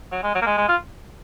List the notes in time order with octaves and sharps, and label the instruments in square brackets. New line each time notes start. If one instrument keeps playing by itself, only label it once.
[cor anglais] F#3
G#3
F#3
A#3
G#3
G#3
F4